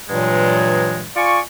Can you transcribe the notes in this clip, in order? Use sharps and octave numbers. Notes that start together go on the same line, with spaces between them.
G2 A#2 E3 F#3 G#3
F4 D5 G#5 C#6